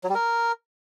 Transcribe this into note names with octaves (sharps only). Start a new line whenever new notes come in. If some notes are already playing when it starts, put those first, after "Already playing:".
F#3
G3
A#4